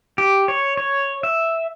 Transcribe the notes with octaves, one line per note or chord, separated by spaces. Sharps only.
G4
C#5
C#5
E5